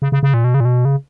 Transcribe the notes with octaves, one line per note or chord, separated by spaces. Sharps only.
C#3
C#3
C#3
A#2
B2
C#3
A#2
B2
C#3